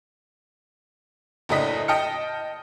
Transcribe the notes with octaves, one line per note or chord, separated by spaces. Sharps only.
F#1 A2 D4 D#5 B6
D#5 G5 A5 F6 C#7